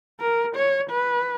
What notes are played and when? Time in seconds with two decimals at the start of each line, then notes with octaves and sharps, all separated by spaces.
0.20 A#4
0.56 C#5
0.90 B4